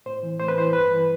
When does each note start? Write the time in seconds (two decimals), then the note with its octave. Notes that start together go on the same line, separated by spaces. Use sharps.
0.06 A2 C5
0.23 E3
0.40 A2 C5
0.48 B4
0.57 E3 C5
0.73 G2 B4
0.91 E3